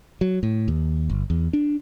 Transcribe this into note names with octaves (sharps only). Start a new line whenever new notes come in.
F#3
A2
D#2
G1
E2
D4